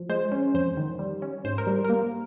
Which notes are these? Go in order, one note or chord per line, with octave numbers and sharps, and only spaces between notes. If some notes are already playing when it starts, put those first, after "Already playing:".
Already playing: F3
G#3 C5
C#4
F2 C5
D#3
G3
C#4
G#2 C5
A#4
G3
A#3 A#4